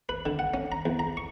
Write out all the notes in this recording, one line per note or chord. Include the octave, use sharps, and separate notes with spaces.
B4
D3
F#5
C#4
A#5
E2
A#5
C#6